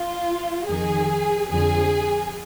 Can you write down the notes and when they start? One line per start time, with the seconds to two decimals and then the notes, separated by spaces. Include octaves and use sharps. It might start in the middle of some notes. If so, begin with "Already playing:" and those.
Already playing: F4
0.68 F2 D#3 G#4
1.51 F2 D3 F3 G#4